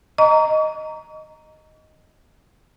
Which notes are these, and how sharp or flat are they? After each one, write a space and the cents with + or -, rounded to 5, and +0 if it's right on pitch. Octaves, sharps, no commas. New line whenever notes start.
D#5 +0 A#5 -10 C#6 +45